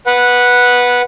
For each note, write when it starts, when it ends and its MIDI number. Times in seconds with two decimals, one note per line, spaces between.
0.06 1.02 71
0.06 1.02 78